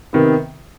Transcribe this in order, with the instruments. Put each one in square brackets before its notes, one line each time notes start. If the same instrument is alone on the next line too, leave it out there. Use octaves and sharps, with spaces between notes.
[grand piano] C3 D#3 B3